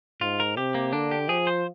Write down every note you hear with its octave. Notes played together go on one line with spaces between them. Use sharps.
G#2 F4
A#4
C3 G4
A#3
D3 D4
G4
F3 G#4
C5